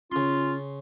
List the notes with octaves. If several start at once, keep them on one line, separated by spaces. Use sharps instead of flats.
C#3 C#4 F4 C6